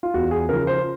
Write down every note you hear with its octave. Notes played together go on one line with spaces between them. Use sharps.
F4
E2 F#4
G#4
C#3 F3 A#4
C5